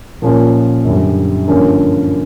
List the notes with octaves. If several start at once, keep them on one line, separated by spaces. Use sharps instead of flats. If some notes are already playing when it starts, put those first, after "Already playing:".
A#2 F3 A#3 C#4 F4
F#2 D3 G3
G2 D3 F3 A#3 C#4